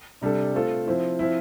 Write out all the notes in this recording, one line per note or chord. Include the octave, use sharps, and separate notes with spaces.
C3 G3 D4 A4
A3 C4 F4 A4
F3 C4 E4
F3 C4 E4